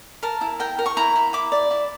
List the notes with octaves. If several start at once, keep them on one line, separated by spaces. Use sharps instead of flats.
A#4 A5
E4
A#4 G5
A#4
C#6
E4 A#5
E4
E4 D6
D5
E4